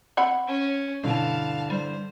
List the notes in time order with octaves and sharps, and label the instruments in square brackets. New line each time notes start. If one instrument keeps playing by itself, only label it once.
[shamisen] C4 F#5 B5
[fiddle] C#4
[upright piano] G2 D3 E3 [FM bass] B2 [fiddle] F5 A5
[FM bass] G3 [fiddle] C5